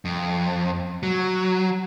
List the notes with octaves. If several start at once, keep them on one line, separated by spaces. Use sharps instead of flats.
F2
F#3